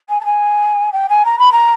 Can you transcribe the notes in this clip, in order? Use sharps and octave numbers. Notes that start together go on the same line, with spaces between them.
G#5
A5
G#5
G5
G#5
A#5
B5
A#5